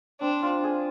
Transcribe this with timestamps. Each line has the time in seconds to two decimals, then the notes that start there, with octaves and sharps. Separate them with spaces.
0.21 C4 D4
0.43 F4
0.64 G#4